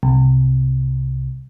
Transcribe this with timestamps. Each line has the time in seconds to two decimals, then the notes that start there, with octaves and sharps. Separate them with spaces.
0.03 C2